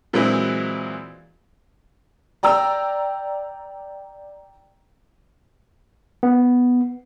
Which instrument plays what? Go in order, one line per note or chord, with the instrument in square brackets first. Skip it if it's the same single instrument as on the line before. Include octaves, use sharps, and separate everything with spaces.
[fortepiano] A#2 E3 F#3 G#3 C4 E4
[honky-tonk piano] D5 G5 A#5 E6
[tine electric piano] B3